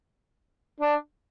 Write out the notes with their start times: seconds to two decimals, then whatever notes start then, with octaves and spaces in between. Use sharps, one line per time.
0.80 D4